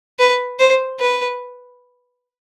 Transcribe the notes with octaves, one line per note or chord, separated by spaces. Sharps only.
B4
C5
B4